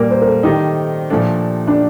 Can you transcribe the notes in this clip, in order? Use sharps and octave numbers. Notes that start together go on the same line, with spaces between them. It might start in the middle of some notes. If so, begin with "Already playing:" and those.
Already playing: A#2 G3 A#3 A#4 D5
C5
A#4
A4
D#3 A3 D#4 G4
A#2 F3 A3 D4
D4